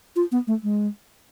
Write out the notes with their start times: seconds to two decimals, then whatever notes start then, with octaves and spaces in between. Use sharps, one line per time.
0.16 F4
0.32 B3
0.47 A3
0.63 G#3